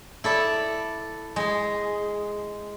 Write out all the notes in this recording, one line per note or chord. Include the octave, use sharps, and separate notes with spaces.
E4 A4 D5
G#3 G#4